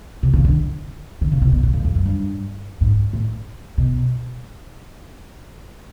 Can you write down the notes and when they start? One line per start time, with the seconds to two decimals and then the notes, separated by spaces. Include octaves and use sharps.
0.23 C3
0.33 C#3
0.44 D3
1.21 D3
1.32 C#3
1.42 C3
1.52 B2
1.63 A#2
1.73 F2
1.85 F2
1.95 F#2
2.06 G2
2.81 G#2
3.13 A2
3.78 B2